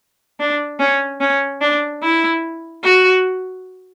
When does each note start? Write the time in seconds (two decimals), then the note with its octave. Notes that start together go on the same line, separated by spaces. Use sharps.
0.40 D4
0.79 C#4
1.21 C#4
1.61 D4
2.02 E4
2.84 F#4